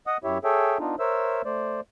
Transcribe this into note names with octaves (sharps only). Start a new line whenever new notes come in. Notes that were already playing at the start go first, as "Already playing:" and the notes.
D#5 F#5 D#6
F#2 E4 G4 C#5 E5
G#4 A4 C#5 E5 G5
B3 D4 D#4 F4
A#4 C5 C#5 E5 E6
A3 C5 D5